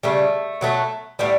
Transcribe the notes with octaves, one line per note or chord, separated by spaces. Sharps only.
C#3 G3 A3
B2 F#3 A3
A2 G3 B3